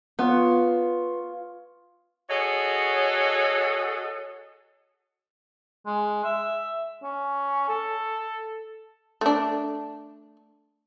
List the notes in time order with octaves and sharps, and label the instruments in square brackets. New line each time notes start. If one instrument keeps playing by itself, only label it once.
[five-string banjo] B3 [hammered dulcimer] F4 C#5
[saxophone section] F#4 G#4 A4 C#5 D#5
[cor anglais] G#3
E5
C#4
A4
[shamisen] A3 D4